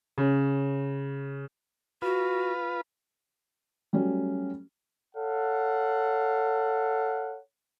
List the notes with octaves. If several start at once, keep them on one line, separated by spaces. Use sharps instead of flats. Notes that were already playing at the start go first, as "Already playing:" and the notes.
C#3
F4 F#4 B4
F#3 G3 A3 C#4
A4 C#5 F5 F#5